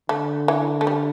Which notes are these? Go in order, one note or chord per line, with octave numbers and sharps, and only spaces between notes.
D3 A3
E3
A3
G3